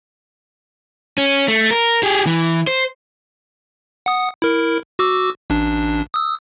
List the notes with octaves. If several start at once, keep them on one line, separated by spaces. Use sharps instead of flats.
C#4
A3
A#4
G4 G#4
E3
C5
F#5 D#6
E4 A#4
F#4 D6 E6
A1 D4
D#6 E6